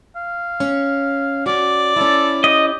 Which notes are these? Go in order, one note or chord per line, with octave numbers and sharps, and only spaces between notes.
F5
C#4
C#4 F#4 D5 D6
C#4 E4 A4
G4 D#5